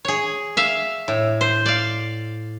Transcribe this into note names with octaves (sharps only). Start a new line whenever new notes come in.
G#4 C#5
E5 F5
A2
C5
D5 F5